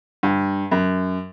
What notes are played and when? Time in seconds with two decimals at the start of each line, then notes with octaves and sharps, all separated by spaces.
0.23 G2
0.71 F#2